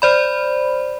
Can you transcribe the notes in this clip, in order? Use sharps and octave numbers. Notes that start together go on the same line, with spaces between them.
C5 D5 B5